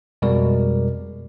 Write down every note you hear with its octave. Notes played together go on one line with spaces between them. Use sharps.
F2 B2 G3 G#3 A#4 D5